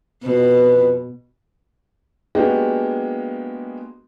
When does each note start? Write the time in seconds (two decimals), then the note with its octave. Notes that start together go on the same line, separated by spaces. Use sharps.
0.23 F2 B2 B4
2.35 G#3 A#3 B3 D4 F#4 G4